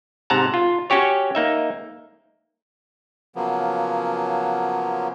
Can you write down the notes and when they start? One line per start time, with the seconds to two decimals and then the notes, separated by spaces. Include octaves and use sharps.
0.30 G#2 C3 F#5 A5 A#5
0.54 F4
0.90 C#4 F#4 G4 C#5
1.35 A#3 D#4 E5
3.36 C#3 F3 F#3 A#3 B3